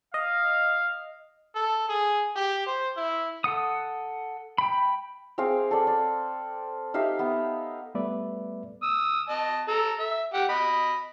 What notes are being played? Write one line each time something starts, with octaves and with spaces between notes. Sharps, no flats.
D#5 F5
A4
G#4
G4
C5
E4
A4 F#5 D#6
G5 B5
C4 G#4 F5 D6
A4 D5
D5
D#4 G4 E5 F5
B3
G3 A3 B3 B4 D5 E5
D#6 E6
D#5 A5
A4 A#5
E5
G4 F#5
D#5 B5